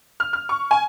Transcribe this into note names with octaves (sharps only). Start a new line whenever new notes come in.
F6
F6
C#6
G#5